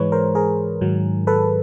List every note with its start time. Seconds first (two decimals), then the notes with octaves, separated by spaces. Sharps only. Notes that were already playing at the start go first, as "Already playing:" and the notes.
Already playing: G#2 E3 G#3 B4 C#5
0.12 A#4 C5
0.35 G#4 A#4
0.81 G#2 D#3 F#3
1.27 A4 B4